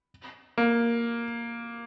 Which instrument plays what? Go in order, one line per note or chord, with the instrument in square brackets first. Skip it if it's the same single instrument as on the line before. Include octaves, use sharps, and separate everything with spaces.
[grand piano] A#3